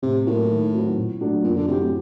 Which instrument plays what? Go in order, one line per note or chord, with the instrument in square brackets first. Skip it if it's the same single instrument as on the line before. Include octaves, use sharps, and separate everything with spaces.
[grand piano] A2 [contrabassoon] C3
[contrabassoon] A2 [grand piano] F#3 A#3 F#4 A#4
[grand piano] D#3
F#3 C4 D#4 F#4
A#2
F#3 A3 D4 A4
[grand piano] F#2 [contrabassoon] A#2
[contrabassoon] D3
[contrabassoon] C3 [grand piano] F#3 C4 G4
[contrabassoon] A2